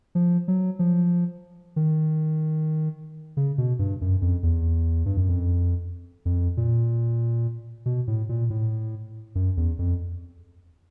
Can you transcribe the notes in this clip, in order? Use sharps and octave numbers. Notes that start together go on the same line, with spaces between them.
F3
F#3
F3
D#3
C#3
B2
G2
F#2
F2
E2
G2
F#2
F2
F2
A#2
B2
A2
A#2
A2
F#2
E2
F2